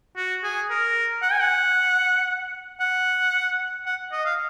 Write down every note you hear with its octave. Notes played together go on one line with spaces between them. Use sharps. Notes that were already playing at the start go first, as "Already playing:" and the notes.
F#4
G#4
A#4
F#5
G#5
F#5
F#5
F#5
D#5
F5